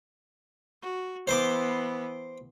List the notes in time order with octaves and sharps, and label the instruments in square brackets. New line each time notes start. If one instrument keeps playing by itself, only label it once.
[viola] F#4
[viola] E3 B3 [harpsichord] C5 C6 D6